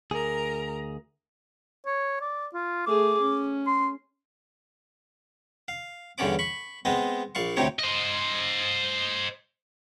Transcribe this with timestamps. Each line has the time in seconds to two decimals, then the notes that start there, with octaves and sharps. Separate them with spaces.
0.11 D2 G#4 A#4 A#5
1.86 C#5
2.21 D5
2.54 F4
2.87 A3 G#4 D6
3.21 C#4
3.67 C6
5.68 F5
6.18 E2 G2 D3 C#4 D5 D6
6.39 B5 C#6
6.85 G#3 B3 C4 D#5
7.35 A#1 D5 F5 C#6
7.57 D2 A2 C3 C4 D#4 C#5
7.79 C5 D#5